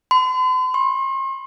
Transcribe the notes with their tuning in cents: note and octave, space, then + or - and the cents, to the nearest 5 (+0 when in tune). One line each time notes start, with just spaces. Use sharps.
C6 -45
C6 +45